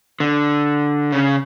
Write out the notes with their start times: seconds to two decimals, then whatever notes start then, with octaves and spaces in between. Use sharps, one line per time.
0.20 D3
1.12 C#3